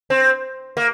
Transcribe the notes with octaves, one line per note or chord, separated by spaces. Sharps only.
C4
A#3